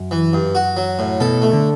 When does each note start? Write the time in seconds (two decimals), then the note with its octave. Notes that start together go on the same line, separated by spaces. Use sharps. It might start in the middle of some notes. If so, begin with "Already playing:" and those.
Already playing: F#2
0.11 E3
0.33 G2
0.55 F#4
0.77 F#3
0.99 A2
1.20 B2 A4
1.42 A3
1.53 D3